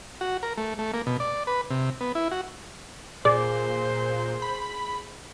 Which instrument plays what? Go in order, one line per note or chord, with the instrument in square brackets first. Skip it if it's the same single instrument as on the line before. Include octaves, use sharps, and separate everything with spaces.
[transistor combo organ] F#4
A#4
A3
A3
A#3
B2
D5
B4
C3
B3
E4
F#4
[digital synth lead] A#2 [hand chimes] G#4 [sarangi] C5 [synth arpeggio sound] D5
[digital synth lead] B5